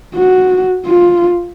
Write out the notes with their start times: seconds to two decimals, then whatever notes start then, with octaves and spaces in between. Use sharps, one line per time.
0.15 F#4
0.86 F4